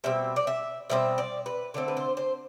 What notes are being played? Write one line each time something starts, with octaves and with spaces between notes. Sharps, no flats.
B2 G3 C4 E5
D5
E5
B2 G3 C4 E5
D5
B4
D3 A3 C4 A4
B4
C5
C5